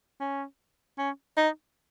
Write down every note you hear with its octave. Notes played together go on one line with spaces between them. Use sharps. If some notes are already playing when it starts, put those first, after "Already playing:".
C#4
C#4
D#4